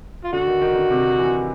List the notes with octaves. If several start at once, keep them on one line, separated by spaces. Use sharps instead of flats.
F4
D3 F#4
D#3
D#3
D3
C3
E3